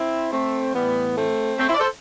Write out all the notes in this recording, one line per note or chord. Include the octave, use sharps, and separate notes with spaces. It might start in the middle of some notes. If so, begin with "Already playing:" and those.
Already playing: C4 E4
A3 C4
A2 E3 G3 B3
A3 C4
A3 C4
C4 E4
D5
A4 C5